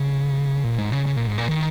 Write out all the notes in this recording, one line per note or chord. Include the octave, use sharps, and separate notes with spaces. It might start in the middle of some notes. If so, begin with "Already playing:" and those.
Already playing: C#3
A#2
G#2
C#3
C#3
A#2
G#2
A#2
D#3